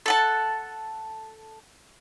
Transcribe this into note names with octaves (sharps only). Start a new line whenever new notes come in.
A4 F#5 A5